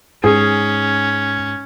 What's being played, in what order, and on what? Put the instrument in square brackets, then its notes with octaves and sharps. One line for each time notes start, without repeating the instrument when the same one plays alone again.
[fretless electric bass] G#2 [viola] C#4 [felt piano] G#4